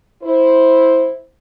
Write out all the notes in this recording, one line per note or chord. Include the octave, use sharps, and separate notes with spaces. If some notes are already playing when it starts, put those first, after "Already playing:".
E4 C5